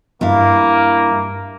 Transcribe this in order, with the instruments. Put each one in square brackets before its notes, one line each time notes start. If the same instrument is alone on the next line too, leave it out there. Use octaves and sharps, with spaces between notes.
[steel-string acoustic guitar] G2 E4 F5 [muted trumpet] A#3